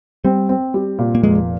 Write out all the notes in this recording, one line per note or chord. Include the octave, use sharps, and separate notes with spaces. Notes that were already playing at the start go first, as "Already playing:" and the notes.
G3 C4
C4
G3
A#2
A#3
F1 G#3